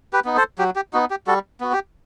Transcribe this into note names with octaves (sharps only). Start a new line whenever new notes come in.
G4 B4
B3 D#4
A4 C5
F#3 G4
G4
B3 D#4 F#4
G4
G3 F#4 A4
B3 F#4
G4